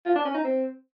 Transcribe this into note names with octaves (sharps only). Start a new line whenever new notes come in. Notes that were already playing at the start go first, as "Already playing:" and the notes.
F4
D4
C#4
D#4
C4